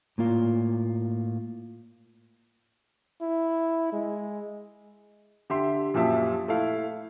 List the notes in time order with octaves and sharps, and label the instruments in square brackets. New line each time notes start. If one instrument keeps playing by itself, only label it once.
[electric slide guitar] A2 A#3 F4
[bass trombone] E4
G#3
[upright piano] D3 G4 E5 C6
F#2 A#2 F3 G4 E5 A5
A3 E4 F5